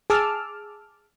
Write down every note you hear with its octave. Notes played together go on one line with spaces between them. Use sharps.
G#4 A5 D6 E6 F6